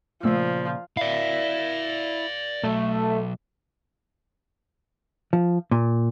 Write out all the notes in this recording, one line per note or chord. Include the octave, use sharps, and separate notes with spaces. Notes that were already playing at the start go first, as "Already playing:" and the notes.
A#2 C#3 F3 A3 E6
E4 D5 F5
B1 F#3 A3
F3
A#2